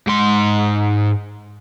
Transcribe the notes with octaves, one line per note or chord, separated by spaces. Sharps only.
G#2 C6